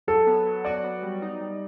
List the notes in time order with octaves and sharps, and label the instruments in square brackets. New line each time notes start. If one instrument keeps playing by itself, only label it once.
[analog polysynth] F#3 [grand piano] A4
[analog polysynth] B3
F#3
[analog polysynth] F#4 [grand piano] D5
[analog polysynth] B3
G3
D#4
G3